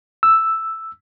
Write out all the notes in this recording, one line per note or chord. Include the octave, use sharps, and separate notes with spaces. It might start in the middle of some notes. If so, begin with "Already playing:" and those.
E6